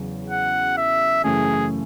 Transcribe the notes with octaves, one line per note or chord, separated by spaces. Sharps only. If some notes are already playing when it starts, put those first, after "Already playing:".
Already playing: E2 C#3 F#3
F#5
E5
F#2 C#3 E3 A3 C#4 G#4